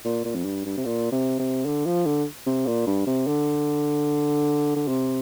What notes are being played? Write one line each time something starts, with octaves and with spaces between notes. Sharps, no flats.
A#2
A#2
F2
G2
G2
C3
A#2
C3
C3
D3
F3
D3
C3
A#2
G2
C3
D3
D3
C3